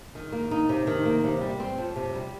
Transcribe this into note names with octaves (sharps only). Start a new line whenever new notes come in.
D#3
A#3
D#4
C3
D#3
A#3
C3
G3
C4
F2
C3
G3